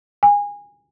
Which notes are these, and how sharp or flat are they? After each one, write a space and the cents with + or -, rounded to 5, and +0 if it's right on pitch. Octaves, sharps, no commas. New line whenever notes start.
G#5 -25